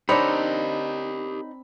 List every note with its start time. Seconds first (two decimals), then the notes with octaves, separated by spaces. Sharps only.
0.09 C4 D4 D#4 G4 A#4 C#5 B5